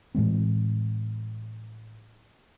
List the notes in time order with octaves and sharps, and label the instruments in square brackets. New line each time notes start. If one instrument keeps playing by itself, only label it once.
[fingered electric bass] A2 E3 G#3 C4